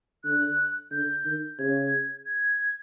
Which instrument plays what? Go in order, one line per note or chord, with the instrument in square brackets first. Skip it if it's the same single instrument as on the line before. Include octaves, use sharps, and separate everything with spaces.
[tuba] D3 [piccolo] F#6
[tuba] D3 [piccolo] G6
[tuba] D#3
[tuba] C#3 [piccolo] G#6
[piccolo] G#6